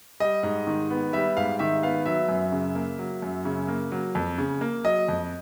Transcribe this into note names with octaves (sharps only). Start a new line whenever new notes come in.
G3 D#5
G#2
D#3
B3
G3 E5
G#2 F5
D#3 E5
B3 F5
F#3 E5
F#2
C#3
A#3
F#3
F#2
C#3
A#3
F#3
F2
C#3
A#3
F#3 D#5
F2